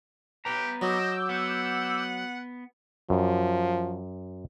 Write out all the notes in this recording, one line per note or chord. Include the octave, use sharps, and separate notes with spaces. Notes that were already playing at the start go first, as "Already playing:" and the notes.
B3 G4 B4 A#5
F#3 D#5 D6 E6 G6
B3 F#5
F#2 F3